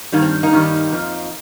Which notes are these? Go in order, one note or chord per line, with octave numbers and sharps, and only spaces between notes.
G2 D#3 G3 A#3 D#4
C4
A#3 D#4
G2 D#3 G3
F2 F3